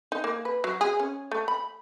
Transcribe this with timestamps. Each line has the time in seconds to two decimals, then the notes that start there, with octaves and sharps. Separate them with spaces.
0.12 D#4
0.24 A#3
0.45 B4
0.64 F#3
0.81 G#4
1.00 C#4
1.31 A3
1.48 B5